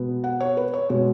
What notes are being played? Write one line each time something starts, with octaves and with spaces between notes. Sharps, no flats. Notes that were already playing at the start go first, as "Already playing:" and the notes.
Already playing: B2 G#3 B3
F#5
C#5
B4
C#5
B2 G#3 C#5